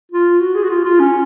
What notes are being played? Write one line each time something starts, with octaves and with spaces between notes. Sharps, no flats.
F4
F#4
G#4
F#4
F4
F4
C#4